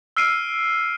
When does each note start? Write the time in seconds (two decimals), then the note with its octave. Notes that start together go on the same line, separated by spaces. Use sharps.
0.17 E6 F6 C7 D7 D#7